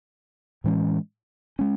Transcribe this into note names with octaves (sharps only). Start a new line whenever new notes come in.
A2 E3 G#3 C#4
G#3 C#4